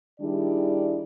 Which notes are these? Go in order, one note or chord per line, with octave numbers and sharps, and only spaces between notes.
D#3 G3 D4 E4 G#4 D5